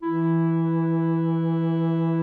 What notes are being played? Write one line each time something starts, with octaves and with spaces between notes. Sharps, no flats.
E3 E4